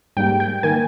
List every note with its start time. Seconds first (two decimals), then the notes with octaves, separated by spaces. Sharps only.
0.17 G#2 G3 A#3 G5
0.40 G5
0.63 D#3 A#3 G#5